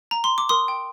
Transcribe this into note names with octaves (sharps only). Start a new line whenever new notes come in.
A#5
C6
D6
A#4 C6 D#6
G5